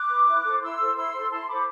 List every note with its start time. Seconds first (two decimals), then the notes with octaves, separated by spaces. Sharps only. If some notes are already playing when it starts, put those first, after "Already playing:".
Already playing: D6 F#6
0.10 B4
0.27 E4
0.44 A4 C5
0.61 E4 C6 E6
0.79 A4 C5
0.95 E4 C6 E6
1.12 A4 C5
1.30 E4 A5 C6
1.47 A4 C5 B5 D6